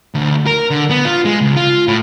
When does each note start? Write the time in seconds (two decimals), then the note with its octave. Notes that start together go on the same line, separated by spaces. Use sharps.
0.15 D2
0.47 A#4
0.70 D3
0.90 B3
1.05 F4
1.25 G#3
1.41 C#2
1.56 F4
1.88 A2